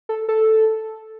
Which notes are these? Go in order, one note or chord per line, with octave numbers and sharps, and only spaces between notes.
A4
A4